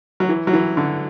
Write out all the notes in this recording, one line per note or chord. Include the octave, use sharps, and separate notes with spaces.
F#3
E3
F#3
E3
D3